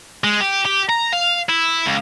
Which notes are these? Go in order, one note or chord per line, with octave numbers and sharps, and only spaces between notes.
G#3
G4
G4
A#5
F5
E4
C#2